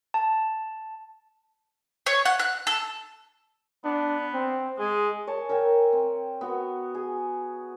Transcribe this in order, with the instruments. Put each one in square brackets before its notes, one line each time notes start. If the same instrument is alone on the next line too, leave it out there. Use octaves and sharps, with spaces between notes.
[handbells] A5
[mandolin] C#5
F#5
F#6
A4
[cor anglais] B3 [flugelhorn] D4
[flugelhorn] C4
[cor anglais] G#3 [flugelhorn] G#4
[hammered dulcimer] C#5 G#5 A5
A#4 E5 G5 G#5
C4
B3 F#4
G#4